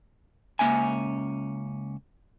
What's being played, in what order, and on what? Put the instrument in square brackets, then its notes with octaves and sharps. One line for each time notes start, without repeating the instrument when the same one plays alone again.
[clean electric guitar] C#2 D#3 A#3 C#4 E5 G#5